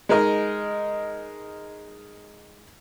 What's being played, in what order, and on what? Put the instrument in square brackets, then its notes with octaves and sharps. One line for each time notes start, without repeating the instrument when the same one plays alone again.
[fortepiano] G#3 D#4 A#4 D#5